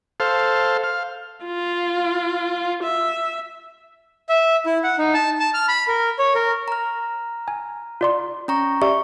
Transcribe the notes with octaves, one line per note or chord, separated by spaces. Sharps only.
A4 C5 F5
F5
F4
E5
E5
E4
F#5
D#4
A5
A5
F6
B5
A#4
C#5
A#4
A#5 F6
G#5
F4 D5 C6
C#4 A#5 C#6
G4 D5 E5 C#6